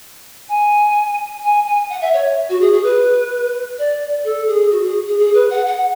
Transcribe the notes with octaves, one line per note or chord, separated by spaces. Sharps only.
G#5
G#5
G#5
F#5
E5
C#5
F#4
G#4
G#4
B4
D5
A4
G#4
F#4
G#4
G#4
G#4
B4
F#5
F#5